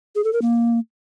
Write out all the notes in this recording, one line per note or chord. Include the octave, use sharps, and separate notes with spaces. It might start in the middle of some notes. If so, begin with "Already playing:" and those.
G#4
A4
A#4
A#3